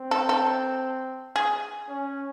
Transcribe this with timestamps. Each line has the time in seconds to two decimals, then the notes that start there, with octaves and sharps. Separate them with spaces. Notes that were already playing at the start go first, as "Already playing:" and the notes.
Already playing: C4
0.11 A4
0.29 A4
1.36 G#4
1.89 C#4